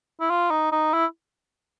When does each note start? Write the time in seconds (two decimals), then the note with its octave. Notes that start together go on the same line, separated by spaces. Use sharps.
0.21 E4
0.30 F4
0.51 D#4
0.72 D#4
0.93 E4